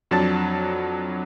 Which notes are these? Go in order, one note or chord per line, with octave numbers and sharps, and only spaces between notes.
F2 F#3 D4 A5 A6